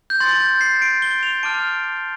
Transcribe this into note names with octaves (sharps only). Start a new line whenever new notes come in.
G6
C6 G6 A6
G6
C7
D7
G7
F7
A5 D6 F6 D7